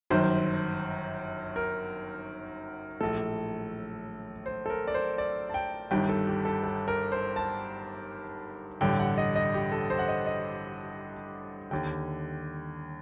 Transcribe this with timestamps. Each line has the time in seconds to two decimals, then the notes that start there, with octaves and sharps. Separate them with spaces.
0.10 G1 F#2 D#3 C5
1.56 A#4
3.01 A#1 A2 A4
4.46 C5
4.66 A4
4.70 A#4
4.87 D5
4.94 C5
5.18 D5
5.50 A5
5.54 G5
5.91 G1 G2 D#3 G5
6.09 A4
6.27 G4
6.45 A4
6.64 A4
6.88 A#4
7.12 C5
7.36 A5
8.81 A1 G2 D3 G5
8.99 F#5
9.18 D#5
9.35 D#5
9.54 G4
9.72 A4
9.90 C5
9.99 F#5
10.08 D#5
10.26 D#5
11.71 D#2 D3 G5